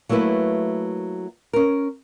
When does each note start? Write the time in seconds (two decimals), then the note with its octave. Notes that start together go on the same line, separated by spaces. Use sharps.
0.09 F#3 A3 A#3 E4 B4
1.53 C#4 A#4